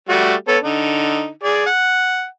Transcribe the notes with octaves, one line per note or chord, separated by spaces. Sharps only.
G3 A3 F#4
B3 A4 C#5
D3 D#4
G#4 D5
F#5